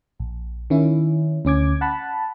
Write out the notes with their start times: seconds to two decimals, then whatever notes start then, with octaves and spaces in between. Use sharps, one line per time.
0.20 A#1
0.70 D#3 C#4 E4
1.45 D2 C#4 D6 G#6
1.81 F#5 A5 B5